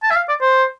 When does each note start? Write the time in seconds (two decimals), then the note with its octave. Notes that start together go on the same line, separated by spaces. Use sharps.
0.03 A5
0.10 E5
0.16 F5
0.29 D5
0.41 C5